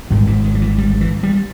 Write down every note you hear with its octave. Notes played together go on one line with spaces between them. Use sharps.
G#1 G#2 G3
E3
D#3
G3
E3
G3
E3
G3